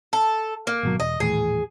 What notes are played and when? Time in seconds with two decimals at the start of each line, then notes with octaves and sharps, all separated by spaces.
0.13 A4
0.67 A#3
0.83 G#1 B2 F#3
1.00 E1 D#5
1.20 D#1 A2 E3 G#4